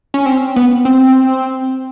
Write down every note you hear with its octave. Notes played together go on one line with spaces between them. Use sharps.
C#4
C4
B3
C4